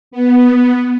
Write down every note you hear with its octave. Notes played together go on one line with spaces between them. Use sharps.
B3